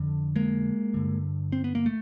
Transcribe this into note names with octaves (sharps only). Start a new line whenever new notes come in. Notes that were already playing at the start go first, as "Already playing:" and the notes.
Already playing: F2 D3
G#3 A#3
G2 D3
C4
B3
A#3
A3